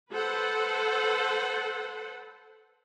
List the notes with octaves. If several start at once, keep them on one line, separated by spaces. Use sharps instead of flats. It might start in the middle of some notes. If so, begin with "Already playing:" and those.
A4 B4 C5 F#5